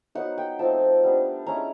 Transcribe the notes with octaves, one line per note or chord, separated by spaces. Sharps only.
F#3 B3 D#4 F#5
G5
F3 A3 C4 D#4 A5
G3 B3 D4
G#3 C#4 E4 A#5